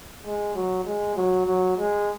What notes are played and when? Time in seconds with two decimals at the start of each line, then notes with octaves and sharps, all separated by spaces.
0.23 G#3
0.55 F#3
0.85 G#3
1.16 F#3
1.46 F#3
1.77 G#3